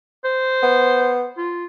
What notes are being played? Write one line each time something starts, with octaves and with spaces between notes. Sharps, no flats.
C5
B3
F4